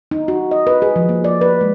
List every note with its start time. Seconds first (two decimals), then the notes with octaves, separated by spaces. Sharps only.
0.11 D#4
0.28 F#4
0.51 D#5
0.67 B4
0.82 G#4
0.96 F3
1.09 A#3
1.24 D5
1.41 B4
1.61 G#3